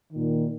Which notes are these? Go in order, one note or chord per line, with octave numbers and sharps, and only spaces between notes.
A#2 D#3